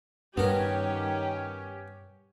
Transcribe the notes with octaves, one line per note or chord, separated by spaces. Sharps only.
G2 D#3 B3 C#4 G4 A#4